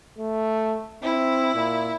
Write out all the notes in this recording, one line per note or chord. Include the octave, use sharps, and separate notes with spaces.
A3
C4 E4
A#2